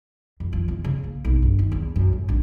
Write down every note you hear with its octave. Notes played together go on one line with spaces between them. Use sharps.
F2
F3
E2
C#3
A#3
B1
G1
D#3
E2
F#2
A2
A#1